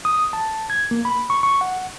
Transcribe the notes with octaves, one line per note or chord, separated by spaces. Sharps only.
D#6
A5
G#6
A#3
B5
C#6
C#6
F#5